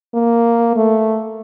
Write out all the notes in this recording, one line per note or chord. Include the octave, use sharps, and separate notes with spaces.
A#3
A3